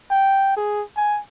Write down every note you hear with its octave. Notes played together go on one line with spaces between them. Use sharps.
G5
G#4
G#5